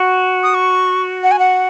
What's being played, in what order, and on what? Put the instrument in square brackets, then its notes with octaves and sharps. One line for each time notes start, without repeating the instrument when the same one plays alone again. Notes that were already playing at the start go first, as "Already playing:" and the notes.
Already playing: [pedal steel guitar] F#4
[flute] D#6
C#6
F#5
G#5
F#5